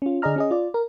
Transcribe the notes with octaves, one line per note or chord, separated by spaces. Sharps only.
C#4 F4
D3 G#4 D5 D#5 A#5 F6
C#4 G#4 D#5
F4 D5
A#4